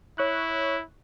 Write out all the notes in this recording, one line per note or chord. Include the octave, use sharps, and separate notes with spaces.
E4 C#5 C#6 F#6